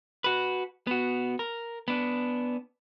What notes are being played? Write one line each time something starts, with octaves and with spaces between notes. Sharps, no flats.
F#4 B4
B3 F#4
A#4
B3 D4